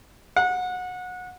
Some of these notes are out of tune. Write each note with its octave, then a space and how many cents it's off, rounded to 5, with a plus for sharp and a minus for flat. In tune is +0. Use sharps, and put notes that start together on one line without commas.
F#5 -25